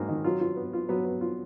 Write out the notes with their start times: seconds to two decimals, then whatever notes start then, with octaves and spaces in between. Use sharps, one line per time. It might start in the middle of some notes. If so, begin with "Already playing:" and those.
Already playing: G#2 F#3 A#3
0.09 D#3
0.24 F#3 F4
0.40 F4
0.57 B3
0.73 F4
0.89 F#3 B3
1.05 B3
1.21 F4